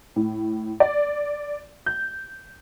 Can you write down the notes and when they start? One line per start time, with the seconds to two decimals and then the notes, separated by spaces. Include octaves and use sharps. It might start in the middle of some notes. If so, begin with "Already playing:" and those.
0.16 A2
0.80 D5
1.86 G6